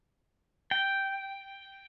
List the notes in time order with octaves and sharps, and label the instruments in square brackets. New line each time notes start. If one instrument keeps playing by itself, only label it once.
[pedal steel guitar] G5